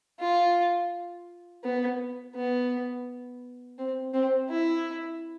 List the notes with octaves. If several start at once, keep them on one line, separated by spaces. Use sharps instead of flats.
F4
B3
B3
C4
C4
E4